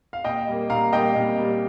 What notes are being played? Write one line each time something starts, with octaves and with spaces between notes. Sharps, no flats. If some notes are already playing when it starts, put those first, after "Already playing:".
F5
A#2 D#5 G5
G3 A#3
A#2 F5 A#5
G3 A#3 D#5 G5
A#2
G3 A#3